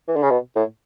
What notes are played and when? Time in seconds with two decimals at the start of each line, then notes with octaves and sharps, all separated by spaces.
0.08 E3
0.16 D3
0.23 C#3
0.30 B2
0.56 A2